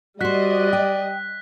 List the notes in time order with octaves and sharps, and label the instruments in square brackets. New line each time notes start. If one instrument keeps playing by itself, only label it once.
[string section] G3 D#5 [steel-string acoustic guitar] F#4 C5 [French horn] D5 [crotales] F#6 B6
[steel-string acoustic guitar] G5